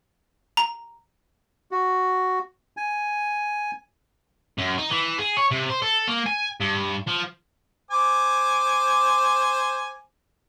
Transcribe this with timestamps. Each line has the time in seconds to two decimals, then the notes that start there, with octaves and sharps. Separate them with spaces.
0.57 A#5
1.71 F#4
2.77 G#5
4.58 F#2
4.78 D#4
4.90 E3
5.18 G#4
5.37 C#5
5.51 C3
5.70 C5
5.82 A4
6.08 A#3
6.26 G#5
6.60 G2
7.08 F3
7.91 C5 G#5 D6